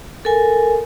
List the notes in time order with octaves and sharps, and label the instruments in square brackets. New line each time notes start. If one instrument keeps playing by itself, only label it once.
[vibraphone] A4 A#4 G#5